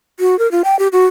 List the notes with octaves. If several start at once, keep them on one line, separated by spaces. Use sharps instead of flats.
F#4
A#4
F4
G5
G4
F#4